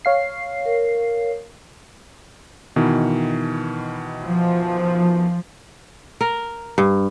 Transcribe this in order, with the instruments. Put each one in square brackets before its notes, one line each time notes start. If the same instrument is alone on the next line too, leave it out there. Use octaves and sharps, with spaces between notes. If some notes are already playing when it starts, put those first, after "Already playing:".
[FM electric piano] C#5 F5 C7
[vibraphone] A#4
[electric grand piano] B2 D#3 E3
[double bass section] F3
[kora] A#4
G2